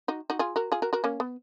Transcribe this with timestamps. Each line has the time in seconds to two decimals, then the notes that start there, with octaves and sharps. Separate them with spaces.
0.08 D#4 F#4
0.30 D#4 F#4
0.39 F4 G#4
0.56 F#4 A#4
0.72 F4 G#4
0.82 F#4 A#4
0.93 F#4 A#4
1.04 A#3 C#4
1.20 B3